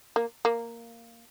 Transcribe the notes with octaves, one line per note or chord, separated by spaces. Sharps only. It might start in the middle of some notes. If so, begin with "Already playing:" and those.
A#3
A#3